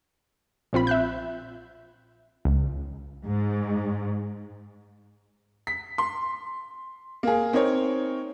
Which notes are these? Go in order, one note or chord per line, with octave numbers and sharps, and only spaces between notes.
A#1 C4 F4 B5
E5 F#6 G6
C#2
G#2
B6
C6
A#3 G#4
C4 D#4 A#4 C#5